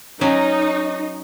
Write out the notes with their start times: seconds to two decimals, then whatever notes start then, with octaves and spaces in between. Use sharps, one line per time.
0.21 F#3 C#4 D#4